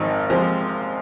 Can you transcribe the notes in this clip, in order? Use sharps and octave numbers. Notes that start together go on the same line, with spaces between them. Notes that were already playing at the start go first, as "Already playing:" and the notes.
Already playing: G#1 G#2 F3 C4 D#4
C3 F3 G#3 C4